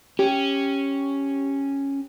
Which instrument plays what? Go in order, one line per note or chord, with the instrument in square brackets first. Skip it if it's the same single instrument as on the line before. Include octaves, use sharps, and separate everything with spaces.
[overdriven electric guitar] C#4 [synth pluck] G4